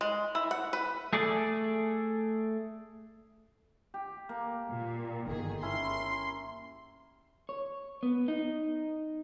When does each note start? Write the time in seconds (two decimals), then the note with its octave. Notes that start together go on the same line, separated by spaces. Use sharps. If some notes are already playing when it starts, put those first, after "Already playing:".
0.01 G#3
0.35 E4
0.51 F#5
0.73 B4
1.13 A3 G#4 A4 D5
3.94 G4
4.29 A#3
4.69 A#2
5.26 G1 D#3 G#4
5.63 C#4 E4 C6
7.49 C#5
8.03 B3
8.28 D#4